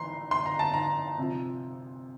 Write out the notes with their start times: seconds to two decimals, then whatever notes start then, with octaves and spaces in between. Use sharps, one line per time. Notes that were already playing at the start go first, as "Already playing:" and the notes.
Already playing: E3 A#5 C6
0.31 C6
0.46 A#5
0.59 A5
0.74 A#5
1.18 C3 F3